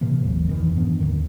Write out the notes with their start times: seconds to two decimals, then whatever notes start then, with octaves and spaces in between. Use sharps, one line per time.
0.01 A2 C3 E3 A#3
0.25 G#1 D#2 E3 F#3
0.47 F2 D#3 E3
0.76 G#2 E3 B3 D4
1.00 D#2 A2 D3 D#3